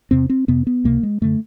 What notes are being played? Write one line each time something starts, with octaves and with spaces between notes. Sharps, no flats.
E2 C3 C4
C4
F2 C3 B3
B3
C#2 C3 A#3
G#3
F#2 D3 A3